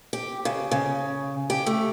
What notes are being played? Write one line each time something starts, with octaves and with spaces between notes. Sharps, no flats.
G4
C#3
C#3
G4
A3